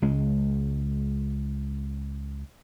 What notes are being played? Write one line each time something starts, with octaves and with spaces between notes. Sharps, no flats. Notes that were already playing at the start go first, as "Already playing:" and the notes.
C#2 G#3